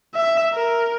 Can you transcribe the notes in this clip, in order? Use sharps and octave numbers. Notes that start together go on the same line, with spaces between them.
E5
A#4